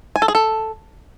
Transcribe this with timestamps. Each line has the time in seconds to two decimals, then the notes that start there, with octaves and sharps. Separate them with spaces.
0.16 G#5
0.22 A4
0.28 G#4
0.35 A4